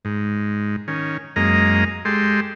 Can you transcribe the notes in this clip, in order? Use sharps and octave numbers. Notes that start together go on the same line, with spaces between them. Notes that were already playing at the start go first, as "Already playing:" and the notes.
G#2
D#3 C#4
F#2 G#3 A#3 D#5 A#5
G#3 G4 A4 C6